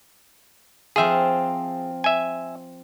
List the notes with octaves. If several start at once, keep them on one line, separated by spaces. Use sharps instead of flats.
F3 C4 F4 G#4 E5
E5 G#5